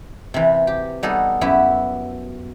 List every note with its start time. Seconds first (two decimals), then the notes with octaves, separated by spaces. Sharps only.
0.34 C3 E3
0.67 G4
1.03 G3 B3 D#4 G#4 A4
1.41 F#2 B3 E4 G4 E5